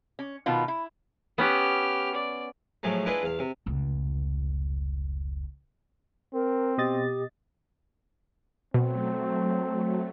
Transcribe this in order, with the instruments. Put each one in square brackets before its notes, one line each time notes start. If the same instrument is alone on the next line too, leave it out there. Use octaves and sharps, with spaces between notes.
[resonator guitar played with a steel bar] C#4
B2 D#3 B3 F4
E4
[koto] B3 C#4 B4 [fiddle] G4 F6
[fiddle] D5
[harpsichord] A2 F3 F#3 G#3 A3
D4 E4 F4 G#4 B4 D#5
E2 F5
C3
[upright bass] F1 C#2
[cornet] C4 [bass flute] A#4
[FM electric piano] B2 D#5 A6 [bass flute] G4
[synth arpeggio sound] B2 [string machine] F#3 A3 [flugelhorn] C4